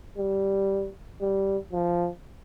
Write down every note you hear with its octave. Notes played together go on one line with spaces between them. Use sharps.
G3
G3
F3